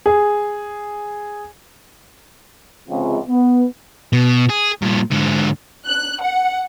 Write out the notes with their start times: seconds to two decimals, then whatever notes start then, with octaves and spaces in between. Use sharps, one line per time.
0.06 G#4
2.89 C#2 C3 F3 G#3
3.28 B3
4.13 B2
4.50 G#4
4.82 G2 A#2
5.11 G#2 D3
5.86 F#6
6.21 F#5